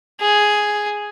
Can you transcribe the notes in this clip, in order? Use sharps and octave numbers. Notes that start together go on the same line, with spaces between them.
G#4